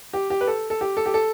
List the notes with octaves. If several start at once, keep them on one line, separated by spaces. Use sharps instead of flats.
G4
G4
B4
A4
A4
G4
A4
G4
A4